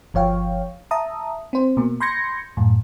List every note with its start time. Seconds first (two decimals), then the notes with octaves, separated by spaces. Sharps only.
0.14 G1 F3 C#5 F5 G5
0.91 E5 A5 A#5 D#6
1.53 C4 C5
1.77 B2 A#3
2.00 B5 C6 G6 G#6 A#6 C#7
2.57 F#2 A2